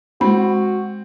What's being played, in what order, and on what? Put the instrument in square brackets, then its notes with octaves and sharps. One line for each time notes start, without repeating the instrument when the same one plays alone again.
[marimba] G#3 B5 [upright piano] C4 [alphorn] F#4